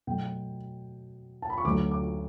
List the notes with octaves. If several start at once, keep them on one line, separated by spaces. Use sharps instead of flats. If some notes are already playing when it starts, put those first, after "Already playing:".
B2 F#3 A3 G5
A5
B5
C#6
D2 D3 F#3 A3 D6
D6